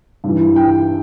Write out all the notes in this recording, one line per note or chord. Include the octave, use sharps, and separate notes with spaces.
G2 E3
G5